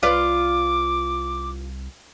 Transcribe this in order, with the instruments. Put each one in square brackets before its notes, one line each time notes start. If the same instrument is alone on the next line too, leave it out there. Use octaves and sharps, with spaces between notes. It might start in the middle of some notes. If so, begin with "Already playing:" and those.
[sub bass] C2 [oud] F4 B4 D5 [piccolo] D6